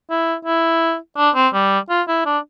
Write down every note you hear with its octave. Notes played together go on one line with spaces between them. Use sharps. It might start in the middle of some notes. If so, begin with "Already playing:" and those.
E4
E4
D4
C4
G3
F4
E4
D4